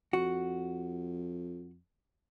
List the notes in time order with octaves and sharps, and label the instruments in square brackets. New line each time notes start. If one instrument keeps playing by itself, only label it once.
[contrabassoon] F2 [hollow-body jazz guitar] F#4